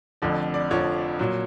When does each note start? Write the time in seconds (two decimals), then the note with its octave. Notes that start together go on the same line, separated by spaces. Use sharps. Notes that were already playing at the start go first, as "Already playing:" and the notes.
0.22 F1 F2 D3 F3 D5
0.54 D5
0.71 F1 F2 D3 F3 C#5
1.19 A#2 F#3